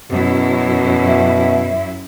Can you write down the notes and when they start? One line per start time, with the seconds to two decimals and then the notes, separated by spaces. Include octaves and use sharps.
0.12 F#2 B2 E4
1.07 E5